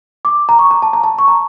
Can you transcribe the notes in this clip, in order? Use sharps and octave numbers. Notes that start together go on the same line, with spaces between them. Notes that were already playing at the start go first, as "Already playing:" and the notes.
D6
A#5
C#6
A#5
A5
A#5
A5
C#6
A#5